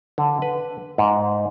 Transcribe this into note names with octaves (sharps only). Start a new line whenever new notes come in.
D3
B4
G#2